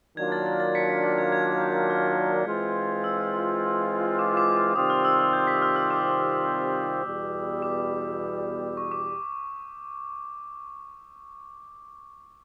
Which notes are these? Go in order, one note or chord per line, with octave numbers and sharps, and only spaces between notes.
D#3 F#3 A#3 D4 F4 G#6
A6
A6
A6
B6 C#7
B6
A6
G#6
G#6
G6
F6
E3 G#3 C4 F4
E6
D6
D6
D6
C3 D#3 G3 C4 F4 D#6
F6
E6
E6
G6
B6
F6
E6
D6
E2 B2 G3
D6
C#6
D6